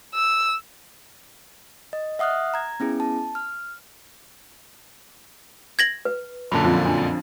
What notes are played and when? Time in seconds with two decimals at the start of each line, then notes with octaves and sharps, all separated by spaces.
0.14 E6
1.93 D#5
2.19 E5 F#5 D#6 F6 F#6
2.54 A#5 G#6
2.80 B3 C#4 E4 G#4
3.00 A5
3.35 F6
5.79 G#6 A#6 F#7
6.05 B4
6.52 F#2 A#2 D3 A5 B5
6.64 F2 F3
6.86 D4